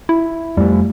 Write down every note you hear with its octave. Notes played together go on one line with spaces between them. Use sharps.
E4
F2 G3 A3